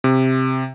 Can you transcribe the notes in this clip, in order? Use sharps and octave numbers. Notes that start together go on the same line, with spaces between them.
C3